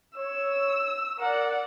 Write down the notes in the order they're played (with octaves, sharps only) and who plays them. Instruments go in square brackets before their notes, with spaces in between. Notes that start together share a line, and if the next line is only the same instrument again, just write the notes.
[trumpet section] C#5 [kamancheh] E6
[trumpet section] A#4 [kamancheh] D5 F#5